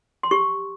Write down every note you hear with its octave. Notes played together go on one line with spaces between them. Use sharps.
C6
G4 C#6